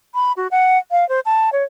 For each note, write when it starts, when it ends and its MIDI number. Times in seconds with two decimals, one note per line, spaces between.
0.14 0.32 83
0.37 0.47 66
0.51 0.78 78
0.91 1.07 77
1.09 1.20 72
1.25 1.50 81
1.53 1.63 73